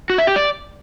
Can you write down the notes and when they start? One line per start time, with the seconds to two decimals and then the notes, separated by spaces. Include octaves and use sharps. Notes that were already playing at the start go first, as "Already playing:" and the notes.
0.10 F#4
0.18 E5
0.27 G4
0.36 D5